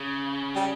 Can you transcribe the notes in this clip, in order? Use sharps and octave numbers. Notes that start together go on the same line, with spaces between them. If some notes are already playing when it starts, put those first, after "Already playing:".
Already playing: C#3
G3